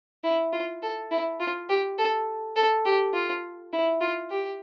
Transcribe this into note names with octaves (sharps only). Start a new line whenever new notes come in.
E4
F4
A4
E4
F4
G4
A4
A4
G4
F4
E4
F4
G4